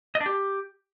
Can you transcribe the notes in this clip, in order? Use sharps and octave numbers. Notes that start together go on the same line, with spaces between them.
D#5
D4
G4